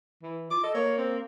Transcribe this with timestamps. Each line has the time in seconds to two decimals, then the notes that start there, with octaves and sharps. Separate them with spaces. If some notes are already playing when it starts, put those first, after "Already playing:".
0.22 E3
0.51 F4 D6
0.63 A4 D#5
0.74 A#3 C#5
0.98 C4